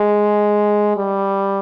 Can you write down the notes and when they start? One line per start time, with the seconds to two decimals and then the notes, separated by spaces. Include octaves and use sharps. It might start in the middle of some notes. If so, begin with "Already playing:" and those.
Already playing: G#3
0.97 G3